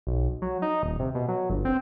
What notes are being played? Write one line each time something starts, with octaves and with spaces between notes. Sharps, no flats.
B1
F#3
D#4
D#1
C3
B2
F#3
G1
C4